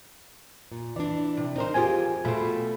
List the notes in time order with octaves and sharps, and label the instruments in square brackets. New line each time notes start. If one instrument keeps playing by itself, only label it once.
[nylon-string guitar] A#2
[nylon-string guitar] E3 D4 [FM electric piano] D5
[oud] C3
[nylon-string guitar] C4 A#4 [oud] D#4 C5
[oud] F2 F4 G4 [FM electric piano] G#4 C5 G#5
[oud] B2 C4 [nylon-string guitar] A3 F4 E5 [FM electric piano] B5